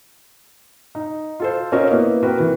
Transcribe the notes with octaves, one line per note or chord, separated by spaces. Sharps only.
D#4
F4 A4 C5
C#4 F4 A#4 C5 C#5 D#5
A#3 B3 E4
C4 F#4 A#4 B4
E3